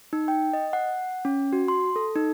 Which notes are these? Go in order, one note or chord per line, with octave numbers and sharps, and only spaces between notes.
D#4
G5
D#5
F#5
C#4
F#4
C6
A4
D#4